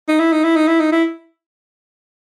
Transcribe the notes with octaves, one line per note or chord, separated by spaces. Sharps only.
D#4
E4
D#4
E4
D#4
E4
D#4
E4